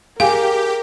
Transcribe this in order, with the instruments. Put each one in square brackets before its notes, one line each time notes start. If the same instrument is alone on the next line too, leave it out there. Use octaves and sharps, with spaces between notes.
[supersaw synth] G4 [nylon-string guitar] G#4 [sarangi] A#4 [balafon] F5